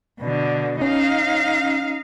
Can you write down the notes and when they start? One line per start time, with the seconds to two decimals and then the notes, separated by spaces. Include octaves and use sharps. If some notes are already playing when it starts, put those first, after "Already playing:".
0.20 B2 D3
0.81 C#4 D#4 F5